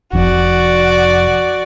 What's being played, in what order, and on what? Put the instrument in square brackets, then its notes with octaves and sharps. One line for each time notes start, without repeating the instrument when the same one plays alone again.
[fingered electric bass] F1 F2 [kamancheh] F#4 D5